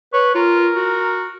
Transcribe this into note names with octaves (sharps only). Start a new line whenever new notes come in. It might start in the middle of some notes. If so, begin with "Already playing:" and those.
B4 C#5
F4 A#4
F#4